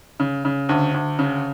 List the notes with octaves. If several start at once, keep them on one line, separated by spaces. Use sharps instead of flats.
C#3
C#3
D2
D2
C#3